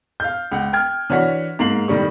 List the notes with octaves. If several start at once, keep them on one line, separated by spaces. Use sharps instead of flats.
F5 G6
C#2 F#5
G5 F6 G#6
E3 D4 F#4 C#5 F#5 B6
G#2 A#3 C7 F#7
A2 D#3 G3 C#6